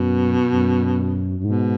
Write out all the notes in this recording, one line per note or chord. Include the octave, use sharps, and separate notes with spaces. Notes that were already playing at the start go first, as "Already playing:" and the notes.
Already playing: F#2 B2
F#2
F#2
G#2 B2